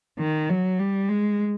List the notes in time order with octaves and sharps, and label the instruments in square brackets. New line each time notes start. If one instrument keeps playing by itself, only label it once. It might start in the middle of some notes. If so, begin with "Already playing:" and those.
[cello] D#3
F#3
G3
G#3